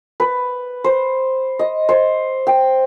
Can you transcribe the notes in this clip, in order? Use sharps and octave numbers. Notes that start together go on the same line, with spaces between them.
B4
C5
D#5
C5
G5